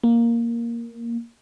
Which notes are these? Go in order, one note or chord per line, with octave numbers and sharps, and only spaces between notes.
A#3